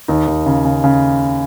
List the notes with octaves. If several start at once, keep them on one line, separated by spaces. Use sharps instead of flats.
D#2 D#4
D#2
C#3
C#3
C#3